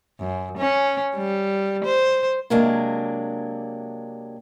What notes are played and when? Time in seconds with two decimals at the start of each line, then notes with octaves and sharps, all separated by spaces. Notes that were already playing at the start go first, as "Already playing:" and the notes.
0.20 F#2
0.58 C#4
1.15 G3
1.84 C5
2.50 C3 F#3 G#3 A#3 D4